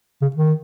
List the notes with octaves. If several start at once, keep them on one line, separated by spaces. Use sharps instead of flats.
C#3
D#3